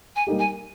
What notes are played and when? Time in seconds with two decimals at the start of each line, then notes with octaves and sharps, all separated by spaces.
0.16 G#5
0.27 G3 A#3 D#4 G4
0.39 G#5